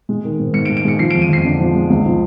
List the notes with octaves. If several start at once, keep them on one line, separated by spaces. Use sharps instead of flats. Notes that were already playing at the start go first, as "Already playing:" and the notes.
G#3
D#3
G#2
G#2 C#7
D7
G#3
D7
G#3 C#7
F3 C7
D7
F2
D#7
F2 C7
D3
F3
G#3
C#2
F3